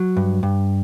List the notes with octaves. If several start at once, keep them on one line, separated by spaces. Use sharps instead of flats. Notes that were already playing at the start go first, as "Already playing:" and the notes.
Already playing: F#3
G2
G2